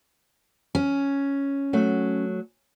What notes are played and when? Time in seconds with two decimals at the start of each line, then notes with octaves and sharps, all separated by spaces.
0.75 C#4
1.73 F#3 A3